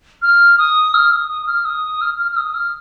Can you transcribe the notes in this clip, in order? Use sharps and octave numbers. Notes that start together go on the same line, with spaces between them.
F6
D#6
F6
D#6
D#6
D#6
F6
D#6
F6
F6
F6
D#6
F6